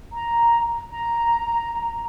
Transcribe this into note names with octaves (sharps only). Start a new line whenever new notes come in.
A#5
A#5